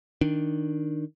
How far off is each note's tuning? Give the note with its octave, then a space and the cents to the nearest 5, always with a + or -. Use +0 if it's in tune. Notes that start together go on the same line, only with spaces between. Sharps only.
D#3 +5 D4 +0